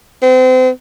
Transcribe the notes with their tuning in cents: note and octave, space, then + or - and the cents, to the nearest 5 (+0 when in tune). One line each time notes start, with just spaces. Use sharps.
C4 -35